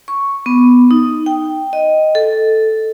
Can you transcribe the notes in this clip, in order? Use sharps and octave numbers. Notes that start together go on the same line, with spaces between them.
C#6
B3
D#4
G5
D#5
A4